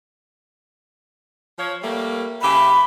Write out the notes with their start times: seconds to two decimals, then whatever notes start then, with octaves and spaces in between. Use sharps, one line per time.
1.58 F3 C#5
1.83 G3 A3 A#3
2.42 C#3 G4 E5 B5